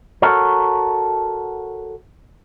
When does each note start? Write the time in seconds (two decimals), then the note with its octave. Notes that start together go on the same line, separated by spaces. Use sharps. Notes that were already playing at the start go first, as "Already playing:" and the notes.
0.22 F#4 A4 A#4 C#5